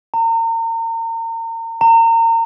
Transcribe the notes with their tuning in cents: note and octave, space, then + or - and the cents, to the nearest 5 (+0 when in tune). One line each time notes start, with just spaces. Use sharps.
A#5 -35
A#5 -30